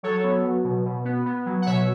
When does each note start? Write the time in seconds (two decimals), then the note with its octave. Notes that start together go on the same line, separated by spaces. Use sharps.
0.03 F#3 A4 C#5
0.24 B3
0.44 F#3
0.64 B2
0.86 B2
1.05 B3
1.26 B3
1.46 F#3
1.62 F#5
1.66 B2 C#5 E5